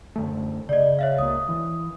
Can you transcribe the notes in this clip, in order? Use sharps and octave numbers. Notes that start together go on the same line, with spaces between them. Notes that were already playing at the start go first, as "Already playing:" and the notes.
F#2 D3 A3
C#3 D5 D#5
C#5 E5 F5
C#2 A#3 D#6
E3